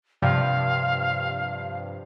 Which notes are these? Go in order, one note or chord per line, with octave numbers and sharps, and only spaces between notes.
G2 C3 F3 F5